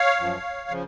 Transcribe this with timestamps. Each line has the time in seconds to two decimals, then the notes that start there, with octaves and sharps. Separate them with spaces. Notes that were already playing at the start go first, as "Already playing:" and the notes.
Already playing: C#5 F5
0.21 F#2 F3
0.70 C#3 F3